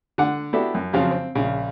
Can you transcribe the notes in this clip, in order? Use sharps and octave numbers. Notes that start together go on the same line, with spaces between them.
D3 F#5
B3 D4 E4 F#4 G4 A4
F#2
F2 C#3 F3 F#3
C4
A#1 C#3